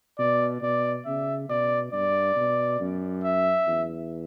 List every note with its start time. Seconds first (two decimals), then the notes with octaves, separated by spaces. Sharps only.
0.18 B2 D5
0.62 B2 D5
1.05 C#3 E5
1.49 B2 D5
1.92 G2 D5
2.36 B2
2.80 F#2
3.24 E5
3.67 E2